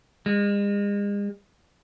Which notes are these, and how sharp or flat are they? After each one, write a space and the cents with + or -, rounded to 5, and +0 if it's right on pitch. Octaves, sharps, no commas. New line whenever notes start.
G#3 -40